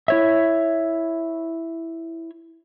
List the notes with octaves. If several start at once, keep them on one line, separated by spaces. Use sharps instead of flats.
E4 C#5 E5